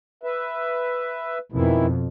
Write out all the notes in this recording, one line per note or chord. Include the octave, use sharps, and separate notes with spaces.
B4 E5
F2 B2 D#3 E3 E4